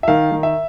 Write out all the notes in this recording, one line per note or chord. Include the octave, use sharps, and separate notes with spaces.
E5
D#3 F5
D#3
E5